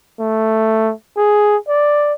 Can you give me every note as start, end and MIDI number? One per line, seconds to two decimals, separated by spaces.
0.20 0.93 57
1.17 1.57 68
1.68 2.14 74